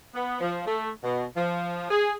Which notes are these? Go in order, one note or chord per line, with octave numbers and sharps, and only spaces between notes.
B3
F3
A3
B2
F3
G#4